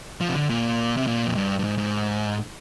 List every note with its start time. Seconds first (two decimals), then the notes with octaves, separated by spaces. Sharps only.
0.21 F3
0.29 C3
0.35 D3
0.50 A#2
0.97 C3
1.07 A#2
1.26 F2
1.35 G2
1.59 G2
1.64 G#2
1.78 G#2